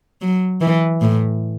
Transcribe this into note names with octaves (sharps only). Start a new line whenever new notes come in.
F#3
E3
A2